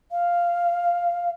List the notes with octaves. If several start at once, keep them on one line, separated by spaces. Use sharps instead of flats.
F5